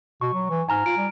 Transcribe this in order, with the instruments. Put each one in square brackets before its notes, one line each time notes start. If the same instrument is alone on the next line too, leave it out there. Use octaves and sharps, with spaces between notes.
[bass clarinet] B2 [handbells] C#6
[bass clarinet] F#3
E3
[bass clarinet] G#2 [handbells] G#5 A#5 F6
[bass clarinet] F4 [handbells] D7
[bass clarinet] G3